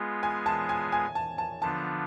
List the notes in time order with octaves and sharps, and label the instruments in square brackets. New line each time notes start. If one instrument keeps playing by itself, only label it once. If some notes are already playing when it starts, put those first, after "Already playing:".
Already playing: [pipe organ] G#3 B3 F4 G#4
[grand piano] G#5
A5
G#5
G#5
A5
A5
[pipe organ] D3 F3 B3 D4 F4 [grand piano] A5